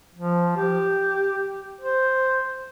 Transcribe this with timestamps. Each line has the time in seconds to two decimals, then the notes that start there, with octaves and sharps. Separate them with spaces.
0.15 F3
0.56 G4
1.81 C5